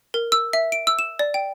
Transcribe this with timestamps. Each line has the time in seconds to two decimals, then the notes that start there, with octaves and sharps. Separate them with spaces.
0.14 A#4
0.32 E6
0.53 E5
0.72 D7
0.87 E6
0.99 E7
1.19 D5
1.34 G5